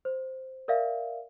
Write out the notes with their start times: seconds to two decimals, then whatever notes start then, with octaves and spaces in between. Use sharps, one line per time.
0.05 C5
0.68 A#4 D5 E5 F5